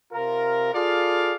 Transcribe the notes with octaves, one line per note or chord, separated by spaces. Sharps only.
C3 F4 A#4
F4 G#4 A4 D5 F5